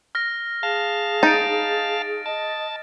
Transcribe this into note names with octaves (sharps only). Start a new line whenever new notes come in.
F6 A#6
G#4 F5 A5
D#4 A6 D7
D#5 A5